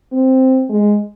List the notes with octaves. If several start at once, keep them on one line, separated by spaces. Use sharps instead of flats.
C4
G#3